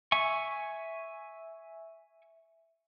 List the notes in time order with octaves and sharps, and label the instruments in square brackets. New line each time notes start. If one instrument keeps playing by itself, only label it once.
[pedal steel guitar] E5 G#5 C#6